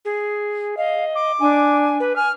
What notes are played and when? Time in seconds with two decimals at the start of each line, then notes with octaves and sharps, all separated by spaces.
0.05 G#4
0.77 D#5 F5
1.15 D6
1.39 D4 G#5
2.00 B4
2.16 G#5 F6